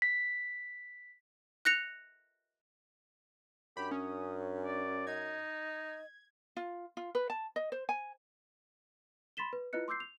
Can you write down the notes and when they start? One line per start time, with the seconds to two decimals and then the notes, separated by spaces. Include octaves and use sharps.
0.02 B6
1.65 F#6 A#6 C#7 F7
3.77 F#2 D4 G4 B5
3.91 C#4 D#6
4.65 D5
5.07 D#4 D#5 G#6
6.57 F4
6.97 F4
7.15 B4
7.30 A5
7.56 D#5
7.72 C5
7.89 G#5
9.37 B5 C6 A6 B6 E7 G7
9.53 B4
9.73 E4 F4 B4 D#5 F#6 C#7
9.88 C6 D6 E6 G6 C7
10.00 F7